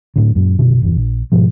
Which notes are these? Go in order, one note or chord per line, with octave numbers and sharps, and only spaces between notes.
A2 D3
F#2 A#2
F#1 B2 D3 D#3
G1 E2
A#1
G#2 B2 F3